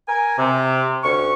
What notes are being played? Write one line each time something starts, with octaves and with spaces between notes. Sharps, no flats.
A#4 G#5
C3
D2 C#4 C#6